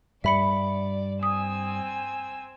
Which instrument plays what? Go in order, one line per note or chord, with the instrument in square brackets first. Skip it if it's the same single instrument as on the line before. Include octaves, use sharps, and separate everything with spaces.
[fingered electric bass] G2 G3 [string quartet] D5 [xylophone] E5 B5 C#7
[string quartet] C4 G#5 E6 [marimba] D#6